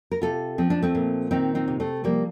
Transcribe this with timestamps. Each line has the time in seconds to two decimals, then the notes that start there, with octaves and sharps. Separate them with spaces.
0.11 A#4
0.22 C3 F4 A4
0.58 F3 C4
0.70 D4
0.82 A3 C4
0.95 A#2
1.31 D#3 C4 D#4
1.55 C4 D#4
1.68 C3
1.80 A3 C4
2.04 F3 G3 A#3